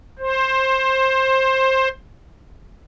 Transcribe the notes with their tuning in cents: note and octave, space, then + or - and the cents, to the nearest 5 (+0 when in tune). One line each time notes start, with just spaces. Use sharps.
C5 +15